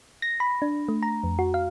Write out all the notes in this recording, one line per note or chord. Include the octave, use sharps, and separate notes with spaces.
A#6
B5
D4
A3
A#5
F2
F#4
F5